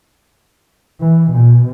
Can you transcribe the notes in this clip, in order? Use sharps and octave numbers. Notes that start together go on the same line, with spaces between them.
E3
B2